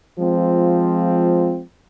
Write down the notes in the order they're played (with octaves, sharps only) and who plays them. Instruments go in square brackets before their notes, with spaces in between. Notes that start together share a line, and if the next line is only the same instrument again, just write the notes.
[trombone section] F3 G#3 C4 F4